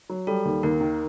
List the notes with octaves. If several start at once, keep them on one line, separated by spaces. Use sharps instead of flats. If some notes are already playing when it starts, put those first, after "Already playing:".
F#3
G3 A4
D#2
D#2 A#4
D#3